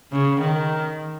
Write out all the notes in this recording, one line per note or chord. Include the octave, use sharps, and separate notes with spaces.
C#3
D#3